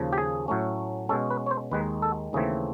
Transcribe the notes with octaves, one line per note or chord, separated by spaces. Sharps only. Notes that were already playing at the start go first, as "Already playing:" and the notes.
Already playing: D#2 C#3 F3
G4
G#4
A2 F#3 A3 C#4
B2 G#3 C#4 A4
B4
C#5
C5
D#2 D#3 G#3 B4
A4
D#2 C#3 E3 A3 C4 G#4